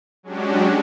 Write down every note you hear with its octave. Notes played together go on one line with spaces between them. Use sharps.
F#3 G#3 C#4 D4 F#4 G4